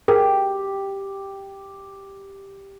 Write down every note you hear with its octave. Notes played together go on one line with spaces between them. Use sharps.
G4 G#4 A#4